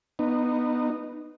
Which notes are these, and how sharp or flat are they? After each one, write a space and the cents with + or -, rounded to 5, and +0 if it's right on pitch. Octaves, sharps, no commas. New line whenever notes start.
B3 +0 D#4 -20